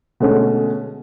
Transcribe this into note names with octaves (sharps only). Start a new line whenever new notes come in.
B2 D3 G#3 A3 C#4